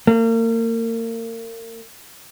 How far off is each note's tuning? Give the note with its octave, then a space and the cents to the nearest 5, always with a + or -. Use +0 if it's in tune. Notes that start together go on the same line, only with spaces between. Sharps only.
A#3 -35